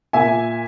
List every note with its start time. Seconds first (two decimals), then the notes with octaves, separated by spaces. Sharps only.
0.13 A#2 E5 G#5